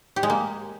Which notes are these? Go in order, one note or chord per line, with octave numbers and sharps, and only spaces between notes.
G4
G#3
A#3